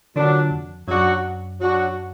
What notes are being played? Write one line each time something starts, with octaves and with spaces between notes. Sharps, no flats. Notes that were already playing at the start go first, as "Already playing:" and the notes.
A#2 D3 F#3 D4 F#4
F2
F#2 F#3 D4 F#4
F#3 D4 F#4